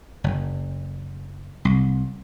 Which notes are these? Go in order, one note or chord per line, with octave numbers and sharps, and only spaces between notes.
F#1
C2